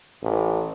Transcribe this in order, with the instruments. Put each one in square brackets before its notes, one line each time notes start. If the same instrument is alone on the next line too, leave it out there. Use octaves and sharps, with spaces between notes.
[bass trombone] A1